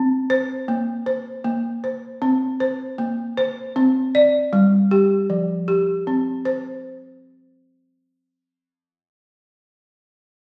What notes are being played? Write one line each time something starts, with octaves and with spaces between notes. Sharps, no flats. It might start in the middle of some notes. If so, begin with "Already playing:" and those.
Already playing: C4
C5
A#3
C5
A#3
C5
C4
C5
A#3
C5
C4
D5
G3
G4
F3
G4
C4
C5